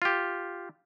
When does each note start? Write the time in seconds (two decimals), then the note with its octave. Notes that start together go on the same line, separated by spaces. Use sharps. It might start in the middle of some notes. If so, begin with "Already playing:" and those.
0.02 F4 G4